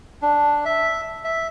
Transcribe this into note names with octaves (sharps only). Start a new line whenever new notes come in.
D4
E5
E5